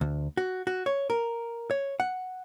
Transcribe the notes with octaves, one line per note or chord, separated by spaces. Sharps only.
D2
F#4
F#4
C#5
A#4
C#5
F#5